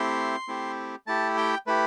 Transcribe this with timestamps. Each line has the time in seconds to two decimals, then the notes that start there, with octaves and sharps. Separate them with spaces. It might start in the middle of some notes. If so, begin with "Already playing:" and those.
Already playing: A3 C4 E4 G4 C6
0.48 A3 C4 E4 G4
1.07 A3 E4 G4 A5
1.37 G5
1.67 A3 E4 G4 B4